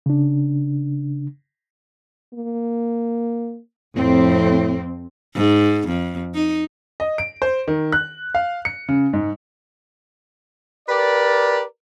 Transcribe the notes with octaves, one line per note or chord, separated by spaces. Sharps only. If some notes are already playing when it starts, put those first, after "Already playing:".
C#3 D4
A#3
F2 A2 C4
G#2
F2
D#4
D#5
D7
C5
D#3
F#6
F5
C#7
C#3
G#2
G4 A#4 B4 D5